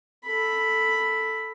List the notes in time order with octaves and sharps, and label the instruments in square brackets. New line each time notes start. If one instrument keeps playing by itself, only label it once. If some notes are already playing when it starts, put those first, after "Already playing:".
[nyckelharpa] A4 B5